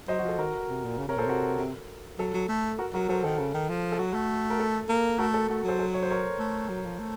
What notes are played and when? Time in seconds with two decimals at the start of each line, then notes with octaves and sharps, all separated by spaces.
0.08 F#3 C5 D#5
0.19 F#4
0.24 F3
0.29 A4
0.38 D#3 F#4 A#4
0.69 C3
0.84 A#2
0.98 C#3
1.08 C3 A#4 C#5
1.17 A#2 A4 C5
1.26 C3 F#4 A#4
1.59 C3
2.18 F#3 A4
2.34 F#3
2.48 A3
2.79 F#4 A#4
2.94 F#3 F#4 A#4
3.09 F#3 A4 C5
3.23 D#3 A4
3.39 C#3
3.54 D#3
3.69 F3
3.92 A4
3.99 F#3 F#4
4.14 A3
4.50 A#4
4.59 A4
4.89 A#3
5.18 A3 F#4 A#4
5.34 A4
5.49 A3 F#4
5.64 F#3 A4 C5
5.78 A4 C5
5.94 C#5
6.03 C5
6.10 A#4 C#5
6.39 A3
6.69 F#3
6.84 F3
6.99 A3